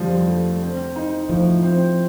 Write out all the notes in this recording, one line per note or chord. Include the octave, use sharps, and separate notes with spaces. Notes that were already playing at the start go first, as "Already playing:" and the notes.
Already playing: F2 D3 F3 G3
A3
C4
D#4
A2 F3
C4